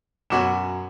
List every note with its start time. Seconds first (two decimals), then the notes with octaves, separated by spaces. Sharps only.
0.30 F#2 B2 F#4 G#5 D6 E7